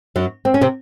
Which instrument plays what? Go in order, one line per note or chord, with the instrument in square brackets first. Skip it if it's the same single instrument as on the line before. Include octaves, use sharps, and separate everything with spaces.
[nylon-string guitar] F#2 F#3
C4
C#4
C3 C4